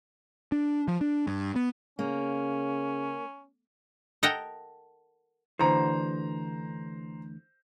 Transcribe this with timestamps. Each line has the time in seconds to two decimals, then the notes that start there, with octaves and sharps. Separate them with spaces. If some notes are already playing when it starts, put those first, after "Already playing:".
0.52 D4
0.88 F3
1.01 D4
1.27 G2
1.56 B3
1.99 C#3 A#3 C#4
4.23 A4 A#4 D#5 F#5 G5
5.59 D2 D3 E3 C5 A#5